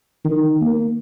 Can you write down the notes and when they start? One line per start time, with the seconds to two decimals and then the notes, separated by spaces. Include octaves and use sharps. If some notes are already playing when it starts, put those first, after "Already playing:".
0.25 D#3
0.61 A#3